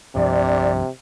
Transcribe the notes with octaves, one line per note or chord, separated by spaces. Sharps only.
C2 G2 C3 F3 D5